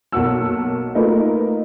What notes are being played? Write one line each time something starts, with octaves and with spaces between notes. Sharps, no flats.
B1 A#3 F#4 F#5 E6
A3 A#3 D#4 F4 A#4 B4